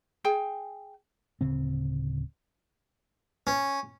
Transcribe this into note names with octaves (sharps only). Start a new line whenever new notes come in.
G#4 G5 G#5
D1 C#3 C4
C#4